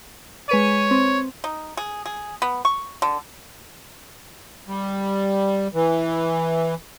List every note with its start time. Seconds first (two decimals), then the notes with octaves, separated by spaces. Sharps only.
0.49 G#3 B4 C#5 D#7
0.91 C4
1.44 D#4
1.77 G#4
2.06 G#4
2.42 B3
2.65 C#6
3.02 D3
4.68 G3
5.74 E3